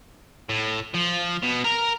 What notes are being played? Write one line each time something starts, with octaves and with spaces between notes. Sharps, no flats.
A2
F3
B2
A#4 A#5